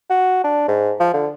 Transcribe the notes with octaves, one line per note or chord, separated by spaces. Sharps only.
F#4
D4
G#2
F3
D3